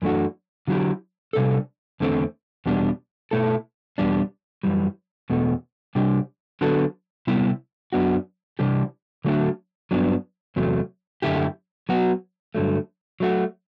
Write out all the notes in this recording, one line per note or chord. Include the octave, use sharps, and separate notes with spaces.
F#2 E3 A3 D4 F#4
D3 F#3 B3 E4 G4
C3 G3 D4 A4
E2 D3 A3 C4
E2 B2 G3 D4
B2 A3 E4 A4
E2 B2 G3 D4
F#2 E3 G3
E2 B2 A3
C3 G3 D4 G4
D3 F#3 B3 F#4 A4
C3 G3 B3 E4
F#2 F#3 B3 D4 F#4
C3 E3 G3 D4 G4
D3 F#3 A3 D4 F#4
G2 F#3 B3 D4
E2 C3 F#3 A3
F#2 D3 A3 E4 G4
F#3 B3 F#4
G2 D3 F#3 A3
F#3 A3 D4 F#4